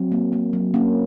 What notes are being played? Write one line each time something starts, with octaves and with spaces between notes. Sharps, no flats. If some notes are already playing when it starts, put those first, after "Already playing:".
Already playing: F#3 C4
A#3
A#3
F#3
A#3 C#4